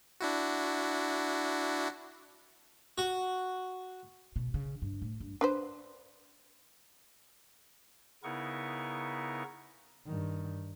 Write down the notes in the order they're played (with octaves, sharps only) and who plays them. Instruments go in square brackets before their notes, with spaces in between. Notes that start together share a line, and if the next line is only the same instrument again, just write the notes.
[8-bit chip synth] D4 E4 F#4
[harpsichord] F#4
[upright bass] B2
C#3
G2
A2
G2
[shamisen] D4 B4 C5
[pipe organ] C#3 B3 D#4 E4 A#4 C#6
[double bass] G2 D#3